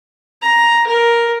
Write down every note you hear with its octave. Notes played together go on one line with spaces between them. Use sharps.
A#5
A#4